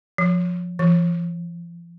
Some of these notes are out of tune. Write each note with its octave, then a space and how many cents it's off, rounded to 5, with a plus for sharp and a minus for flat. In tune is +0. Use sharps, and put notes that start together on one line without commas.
F3 +15
F3 -40